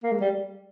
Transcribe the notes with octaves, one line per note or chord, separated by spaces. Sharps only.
A#3
G#3
G3